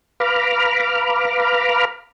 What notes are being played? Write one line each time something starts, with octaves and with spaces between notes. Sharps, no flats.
B4 F5 A#5 B5 D6 F6